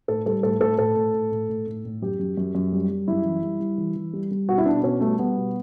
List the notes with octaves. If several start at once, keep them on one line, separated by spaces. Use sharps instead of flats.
A2 A4
G3 A4
A2 A4
A2 A4
A2 A4
A2
A2
A2
A2
A2
A2
F#2 G4
F#2
F#2
F#2
G3
G3
F#2 E4
E3
G3
G3
E3
E3
G3
G3
B2 F#4
E4
B2 D4
B2 C#4
G3 A3
G3 B3
B2